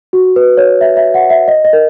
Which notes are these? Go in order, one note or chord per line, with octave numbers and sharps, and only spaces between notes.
F#4
B4
C#5
E5
E5
F#5
E5
D#5
D#5
A#4